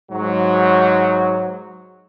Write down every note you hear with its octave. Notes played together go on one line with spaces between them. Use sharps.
G#2 F#3